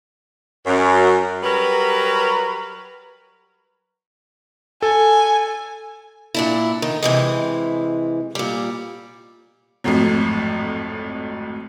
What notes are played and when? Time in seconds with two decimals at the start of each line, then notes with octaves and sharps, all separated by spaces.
0.66 F#2
1.43 F#3 G3 A#4 B4
4.82 A4 G#5
6.35 A#2 D4 E4
6.82 D#3
7.03 C3 E3 G#3
8.35 A#2 G3
9.84 G#1 F2 A2 F3 F#3